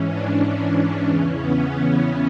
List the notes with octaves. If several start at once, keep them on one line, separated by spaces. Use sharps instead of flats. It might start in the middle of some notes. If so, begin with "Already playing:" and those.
Already playing: G#2 E3 C#4
D4
E2 C#3 E3 C#4
B3
C#4